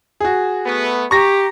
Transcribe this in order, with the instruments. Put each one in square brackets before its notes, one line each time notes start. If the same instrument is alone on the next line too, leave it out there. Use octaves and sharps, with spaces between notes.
[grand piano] F#4 G#4
[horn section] A3 B3
[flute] G4 [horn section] A#5 [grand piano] C#6 A#6